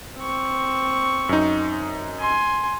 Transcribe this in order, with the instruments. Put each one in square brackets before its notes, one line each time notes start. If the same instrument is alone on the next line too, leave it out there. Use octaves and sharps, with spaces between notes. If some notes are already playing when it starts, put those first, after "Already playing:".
[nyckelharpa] C4 C#6
[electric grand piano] F#2 D#4
[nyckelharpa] G#5 C6